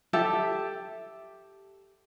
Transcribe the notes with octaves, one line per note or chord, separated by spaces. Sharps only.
G4 A4 E5